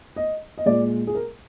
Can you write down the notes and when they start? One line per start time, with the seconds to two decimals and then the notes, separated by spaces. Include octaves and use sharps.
0.16 D#5
0.58 D#5
0.66 A#2 G#3 D5
1.07 G#4
1.15 A#4